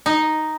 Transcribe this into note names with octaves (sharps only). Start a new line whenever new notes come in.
D#4